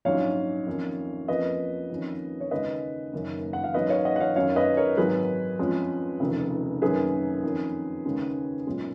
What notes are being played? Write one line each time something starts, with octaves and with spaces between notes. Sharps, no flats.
A#1 G#2 F#3 C#4 C#5 F5
F2 D#3 A#3 C#4
F2 F3 A#3 C#4 B4 D#5
F2 D#3 A#3 C#4
C#5
D#2 C#3 G#3 B4 D#5
F#1 F#2 D#3 A#3 C#4
F#5
F5
G#2 F#3 A#3 C#4 B4 D#5
C#5 F5
D#5 F#5
F#5
C#5 F5
F#2 D#3 F#3 C#4 C#5 F5
B4 D#5
A#4 C#5
G#1 G#2 D#3 F#3 G#4 B4
F2 F3 G#3 C#4
F1 D#2 C#3 F3
F#2 D#3 A#3 C#4 G#4 B4
F2 D#3 A#3 C#4
D#2 C#3 G#3 C#4
B1 A#2 G#3 C#4